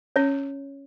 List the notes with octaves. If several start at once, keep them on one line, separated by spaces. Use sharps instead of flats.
C#4 C#5